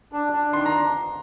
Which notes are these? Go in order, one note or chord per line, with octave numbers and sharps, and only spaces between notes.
D4
D4
D#3 C6
A#5